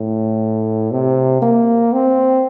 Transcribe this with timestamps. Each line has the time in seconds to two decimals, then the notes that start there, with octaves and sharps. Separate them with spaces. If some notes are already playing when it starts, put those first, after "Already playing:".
Already playing: A2
0.91 C3
1.42 A#3
1.93 C4